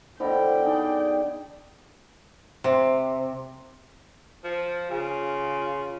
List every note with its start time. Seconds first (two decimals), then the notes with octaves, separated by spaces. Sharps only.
0.20 B2 D3 E4 C5 G5 B5
0.65 D#4 G#4 D5
2.64 C3
4.44 F3
4.90 C#3 F4